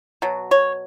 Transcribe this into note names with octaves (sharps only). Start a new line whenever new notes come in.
B2 F#3
C#5